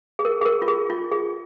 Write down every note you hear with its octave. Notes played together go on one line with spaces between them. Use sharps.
G#4
A#4
G#4
A#4
F4
G#4
F4
G#4